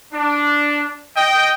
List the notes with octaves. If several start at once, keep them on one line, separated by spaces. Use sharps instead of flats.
D4
D#5 G5